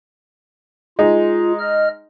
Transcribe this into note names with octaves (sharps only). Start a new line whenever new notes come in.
G#3 D#4 F4
D#5 F6